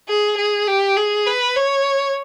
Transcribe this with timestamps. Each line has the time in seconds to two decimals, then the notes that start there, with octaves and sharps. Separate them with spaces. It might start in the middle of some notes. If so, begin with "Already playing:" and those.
0.09 G#4
0.38 G#4
0.67 G4
0.97 G#4
1.26 B4
1.56 C#5